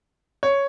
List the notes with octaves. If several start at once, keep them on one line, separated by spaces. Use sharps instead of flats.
C#5